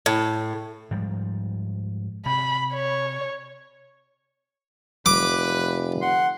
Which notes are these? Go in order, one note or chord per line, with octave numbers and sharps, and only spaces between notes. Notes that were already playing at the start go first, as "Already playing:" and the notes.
A2
G#2 F3 G3
C3 B5
C#5
F1 B4 D6
F#5 C6